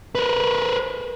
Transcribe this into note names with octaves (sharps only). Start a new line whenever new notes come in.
A#4 B4